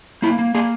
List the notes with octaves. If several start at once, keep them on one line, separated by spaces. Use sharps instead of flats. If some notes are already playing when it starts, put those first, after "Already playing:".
A#3 E4
A#3
A#3 G#4